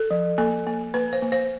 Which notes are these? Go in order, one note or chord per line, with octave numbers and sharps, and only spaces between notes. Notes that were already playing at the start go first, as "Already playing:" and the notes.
Already playing: A4
F3
A#3 A4
A#3
A#3 B4
C5
A#3
C5